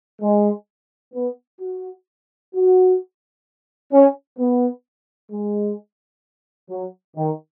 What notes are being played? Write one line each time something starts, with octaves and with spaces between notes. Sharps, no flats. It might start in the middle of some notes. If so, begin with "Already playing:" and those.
G#3
B3
F#4
F#4
C#4
B3
G#3
F#3
D#3